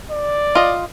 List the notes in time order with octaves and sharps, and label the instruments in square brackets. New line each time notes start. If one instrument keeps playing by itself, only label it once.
[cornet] D5
[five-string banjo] F4 D#5